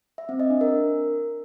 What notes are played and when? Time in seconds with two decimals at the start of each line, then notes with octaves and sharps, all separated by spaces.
0.18 E5
0.29 C4
0.40 D#5
0.50 D4
0.61 A#4